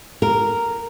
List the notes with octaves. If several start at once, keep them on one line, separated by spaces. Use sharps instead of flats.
A#4